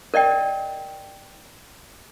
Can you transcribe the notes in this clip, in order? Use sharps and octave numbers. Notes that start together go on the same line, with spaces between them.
A#4 D5 D#5 G5